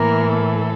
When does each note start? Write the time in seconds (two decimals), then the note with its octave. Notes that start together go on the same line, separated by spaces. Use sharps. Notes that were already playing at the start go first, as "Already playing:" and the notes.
Already playing: A2 E3 A#3 A#4
0.31 A4